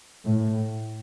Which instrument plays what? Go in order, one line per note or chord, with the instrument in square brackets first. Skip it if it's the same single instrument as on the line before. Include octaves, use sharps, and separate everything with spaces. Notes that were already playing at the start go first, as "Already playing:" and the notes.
[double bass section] A2